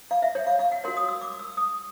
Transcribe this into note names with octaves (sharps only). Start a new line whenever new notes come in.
F5
E5
C#5
F5
F5
F#5
F#4 A#4 C#5 C6
D#6
E6
D6
E6
D#6